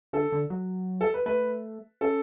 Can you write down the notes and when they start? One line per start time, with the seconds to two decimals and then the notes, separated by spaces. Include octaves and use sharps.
0.13 D3 A4
0.32 D3
0.50 F#3
1.01 A4
1.14 B4
1.26 A3 B4
2.01 C#4 A4